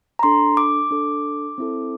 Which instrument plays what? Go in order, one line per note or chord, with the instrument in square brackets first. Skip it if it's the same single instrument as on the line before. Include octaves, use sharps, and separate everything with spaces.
[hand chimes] A#5
D4 A4 C6
D6
D4 A4
C4 E4 A4